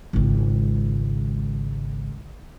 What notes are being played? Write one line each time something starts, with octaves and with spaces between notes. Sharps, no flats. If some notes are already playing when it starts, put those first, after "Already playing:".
G#1 C#2